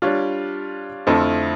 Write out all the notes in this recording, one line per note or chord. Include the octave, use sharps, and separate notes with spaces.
G3 D4 F4 C#5
F2 D3 F3 A3 E4